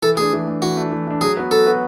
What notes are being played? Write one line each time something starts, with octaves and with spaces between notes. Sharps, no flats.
E3 A4
A3 D4 G#4
E3
A3 D4
E3 F#4
A3 D4
E3
A3 D4
F#3 G#4
B3 F#4 B4
F#3 A4
B3 F#4 B4